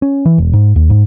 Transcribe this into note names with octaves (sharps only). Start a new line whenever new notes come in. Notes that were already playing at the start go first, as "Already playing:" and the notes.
C#4
E3
E1
G#2
D#2
G#2